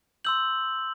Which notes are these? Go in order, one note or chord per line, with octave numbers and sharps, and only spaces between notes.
C6 E6 G6 F#7